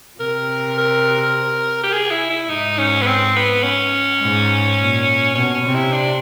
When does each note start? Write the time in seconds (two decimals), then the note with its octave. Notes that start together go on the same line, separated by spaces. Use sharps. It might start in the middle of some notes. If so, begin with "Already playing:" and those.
0.20 C3 A#4
0.78 A#4
1.83 G4
1.93 G#4
2.11 E4
2.30 E4
2.49 G#2 D#4
2.78 C#4
3.02 B3
3.07 C4
3.36 B3
3.63 C#4
4.22 G#2
4.79 A#2
5.35 B2 C#4
5.54 C#4
5.64 C3
5.75 E4
5.93 D4